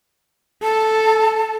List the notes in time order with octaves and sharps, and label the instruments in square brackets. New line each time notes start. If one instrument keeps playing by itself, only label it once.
[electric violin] A4 [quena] A5